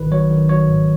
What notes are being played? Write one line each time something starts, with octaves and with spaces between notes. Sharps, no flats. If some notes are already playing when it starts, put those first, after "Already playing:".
Already playing: G#1 D#3 B4
F#3 C#5
D#3
F#3 C#5
G#2